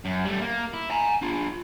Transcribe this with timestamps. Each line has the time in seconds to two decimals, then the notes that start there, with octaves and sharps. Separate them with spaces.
0.05 F#2
0.25 G3 A3
0.41 A#3
0.73 E4
0.91 G#5 A#5
1.22 D4 F4